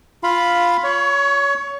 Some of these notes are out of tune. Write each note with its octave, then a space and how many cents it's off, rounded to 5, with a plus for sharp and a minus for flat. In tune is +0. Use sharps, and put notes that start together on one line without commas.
F4 +0 F5 +5 B5 +0
C#5 +25 C#6 +0